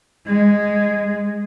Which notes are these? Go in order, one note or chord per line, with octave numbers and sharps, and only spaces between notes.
G#3